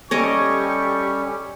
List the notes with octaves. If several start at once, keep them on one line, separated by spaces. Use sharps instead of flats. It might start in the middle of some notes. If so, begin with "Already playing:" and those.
G3 C#4 G4 A4 C#5 D#5 C#6 D6